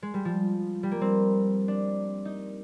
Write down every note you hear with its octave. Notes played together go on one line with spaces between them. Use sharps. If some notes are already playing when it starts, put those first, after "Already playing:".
G#3
G3
F3
G3
A#3
C4
D4
D#4